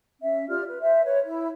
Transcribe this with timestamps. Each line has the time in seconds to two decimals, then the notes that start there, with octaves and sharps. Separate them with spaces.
0.21 C#4 E5
0.49 F4 G4 D5 F6
0.67 B4
0.82 C5 E5
1.05 B4 C#5
1.24 E4